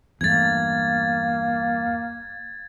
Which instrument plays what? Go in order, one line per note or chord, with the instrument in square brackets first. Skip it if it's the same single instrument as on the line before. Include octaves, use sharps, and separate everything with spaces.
[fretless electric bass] E2 G2 A3 [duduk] A#3 [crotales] G#6 A6